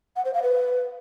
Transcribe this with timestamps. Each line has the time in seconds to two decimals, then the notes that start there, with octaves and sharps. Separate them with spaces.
0.16 F#5
0.25 C5
0.34 F5
0.43 B4